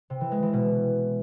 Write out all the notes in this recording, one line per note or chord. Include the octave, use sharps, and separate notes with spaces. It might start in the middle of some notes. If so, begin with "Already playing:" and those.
C3
E3
G#3
E3
B2